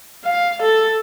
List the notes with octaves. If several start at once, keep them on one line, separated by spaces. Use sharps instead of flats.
F5
A4